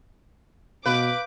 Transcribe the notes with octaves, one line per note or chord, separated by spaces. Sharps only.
B2 B4 F5 D6 G6